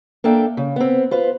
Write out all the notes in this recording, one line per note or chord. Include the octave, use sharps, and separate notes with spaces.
A#3 D4 A4 E5 G5
C#3
B3 C4
F4 B4 C5